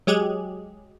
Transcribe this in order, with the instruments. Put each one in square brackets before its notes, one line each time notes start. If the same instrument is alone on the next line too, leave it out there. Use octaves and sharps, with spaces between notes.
[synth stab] F#3 G#3 G4 G#4